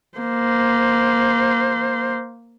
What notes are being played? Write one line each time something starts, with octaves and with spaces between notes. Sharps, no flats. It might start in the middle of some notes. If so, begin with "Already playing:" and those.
A#3 C5